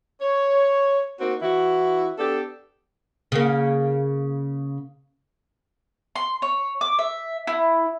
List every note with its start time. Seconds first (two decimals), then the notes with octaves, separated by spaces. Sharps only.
0.21 C#5
1.20 A#3 C4 D#4 F#4
1.42 E3 E4 F#4
2.18 B3 D4 G4 A4
3.32 C#3 A#3
6.15 C6
6.42 C#5
6.81 D6
6.99 E5
7.47 E4